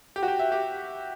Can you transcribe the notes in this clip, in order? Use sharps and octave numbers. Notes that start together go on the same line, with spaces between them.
G4
F#4
G4
E5
G4